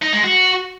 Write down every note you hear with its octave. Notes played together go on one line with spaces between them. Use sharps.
D#4
G#3
F#4